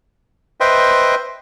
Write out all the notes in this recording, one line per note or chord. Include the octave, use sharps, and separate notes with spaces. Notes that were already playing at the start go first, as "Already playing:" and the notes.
B4 C5 D#5 E5 G5 C6